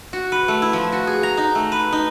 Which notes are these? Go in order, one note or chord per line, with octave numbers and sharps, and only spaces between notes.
F#4
B4
A3
E4
F3
F#4
G#4
A#5
D#4
A3
B4
D#4